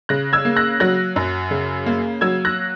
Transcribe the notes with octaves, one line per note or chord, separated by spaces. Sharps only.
C#3 F#6 A#6
E6 G#6
A#3
F#6 A#6
F#3 F#6 A#6
F#2
C#3
A#3
F#3 E6 G#6
F#6 A#6